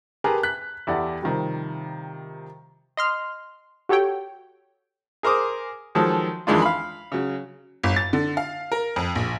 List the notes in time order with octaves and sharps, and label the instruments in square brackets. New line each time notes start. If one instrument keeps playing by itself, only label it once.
[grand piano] G4 G#4 A#4 B4 A5
F#6 B6
E2 E4 G4 A4 D5 F#5
C3 D#3 F3 G3
[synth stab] D#5 C6 F6
F#4 G4 A4 C#5 G5
[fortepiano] G#4 A#4 C5 D6 D#6
D#3 F3 F#3 G#3 A4
F2 D#3 E3 G#3 D4 F4
F5 B5
C#3 F#3
[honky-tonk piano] G1
A6
D3
F5
A#4
F2
A#1